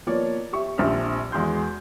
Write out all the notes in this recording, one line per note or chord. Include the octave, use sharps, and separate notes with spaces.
F3 A#3 B3 C#5 D5
G4 E5 C#6
A#1 C4 D4 G4 E5 F6
E2 G#3 F#4 C6 G6